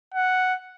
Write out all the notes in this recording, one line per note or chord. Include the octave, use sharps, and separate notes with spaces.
F#5